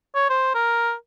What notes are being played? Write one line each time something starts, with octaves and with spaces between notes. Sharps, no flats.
C#5
C5
A#4